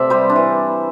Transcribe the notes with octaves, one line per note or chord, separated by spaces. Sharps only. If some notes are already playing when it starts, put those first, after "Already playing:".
Already playing: C3 A3 D5 E5
G3 C5
D4
E3